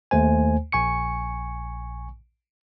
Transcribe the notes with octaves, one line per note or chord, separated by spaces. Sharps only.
D#2 A3 C5 G#5
A#1 G#5 C#6 C#7